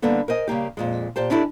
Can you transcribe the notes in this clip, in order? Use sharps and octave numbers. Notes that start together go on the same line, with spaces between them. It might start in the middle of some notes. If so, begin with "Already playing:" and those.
D3 G3 A#3 B3 A4
A#4 C5 D#5 G#5
C#3 G3 A#3 G4
F2 A#2 G#3
A#2 G4 C5 A5
C#4 D4 E4 F#4 G4 A4